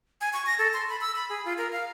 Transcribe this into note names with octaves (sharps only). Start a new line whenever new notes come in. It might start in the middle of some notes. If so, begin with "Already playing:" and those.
G#5
C#6
A#6
A4
C6
B5
E6
B5
G#4
F4
A#4
F5